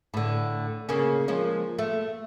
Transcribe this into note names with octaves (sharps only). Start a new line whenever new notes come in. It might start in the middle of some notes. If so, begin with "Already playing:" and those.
A2 D3
C#3 A#3 C#4
F3 G#3 A#3
A3